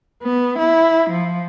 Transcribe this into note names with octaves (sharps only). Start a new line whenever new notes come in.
B3
E4
F3